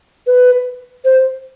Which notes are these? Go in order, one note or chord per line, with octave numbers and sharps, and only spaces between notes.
B4
C5